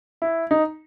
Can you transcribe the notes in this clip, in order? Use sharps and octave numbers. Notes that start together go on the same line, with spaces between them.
E4
D#4